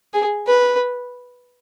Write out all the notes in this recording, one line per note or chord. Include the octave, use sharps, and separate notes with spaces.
G#4
B4